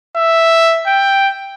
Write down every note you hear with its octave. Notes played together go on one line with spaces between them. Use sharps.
E5
G5